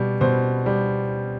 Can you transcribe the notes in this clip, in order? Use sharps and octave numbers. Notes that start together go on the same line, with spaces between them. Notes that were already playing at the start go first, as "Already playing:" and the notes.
Already playing: B2 G3
B2 C5
G3